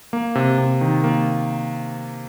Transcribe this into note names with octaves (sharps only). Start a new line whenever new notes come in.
A#3
C3
C3
D#3
A#3